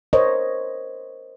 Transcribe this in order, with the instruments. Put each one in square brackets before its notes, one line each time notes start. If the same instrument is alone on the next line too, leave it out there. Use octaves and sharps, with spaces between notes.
[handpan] A#4 C5 C#5 D#5